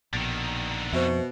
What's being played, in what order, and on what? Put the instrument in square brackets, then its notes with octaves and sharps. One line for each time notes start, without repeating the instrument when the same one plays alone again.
[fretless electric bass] A#1 B2 [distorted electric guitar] D3 D#3
[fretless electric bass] F2 [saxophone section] B2 [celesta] C5 E5